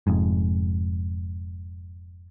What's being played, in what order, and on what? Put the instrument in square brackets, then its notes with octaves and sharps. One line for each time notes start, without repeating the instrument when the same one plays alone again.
[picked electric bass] F1 F2 G#2